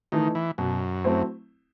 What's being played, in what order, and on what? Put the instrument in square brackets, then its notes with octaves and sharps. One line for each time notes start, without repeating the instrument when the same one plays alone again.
[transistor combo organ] D#3 [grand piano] E3 A3 D#4
[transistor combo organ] E3
[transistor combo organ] F#2 [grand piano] B2
[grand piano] F#3 A3 C4 E4